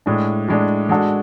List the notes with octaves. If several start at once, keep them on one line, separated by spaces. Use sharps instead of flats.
A2 G#3 D4
A2 G#3 D4
G#3 D4 F#4 A4